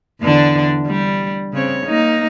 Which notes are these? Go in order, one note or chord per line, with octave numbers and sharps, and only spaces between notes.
E2 D3 D4
G3
C#3 C4 C#5
A#3 D#4